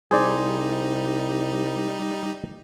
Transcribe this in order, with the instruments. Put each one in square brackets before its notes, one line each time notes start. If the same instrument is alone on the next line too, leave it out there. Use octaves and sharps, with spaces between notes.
[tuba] C2 [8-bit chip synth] G3 D#4 [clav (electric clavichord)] G#4 C5 D5